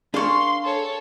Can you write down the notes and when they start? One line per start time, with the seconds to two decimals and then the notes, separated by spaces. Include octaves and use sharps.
0.14 D4 G#4 A#4 F5 C6 C#6
0.64 A4 C#5